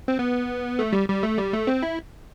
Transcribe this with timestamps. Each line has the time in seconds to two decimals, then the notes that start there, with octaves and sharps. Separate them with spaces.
0.08 C4
0.19 B3
0.79 A3
0.93 G3
1.09 G3
1.23 A3
1.38 G3
1.53 A3
1.67 C4
1.83 E4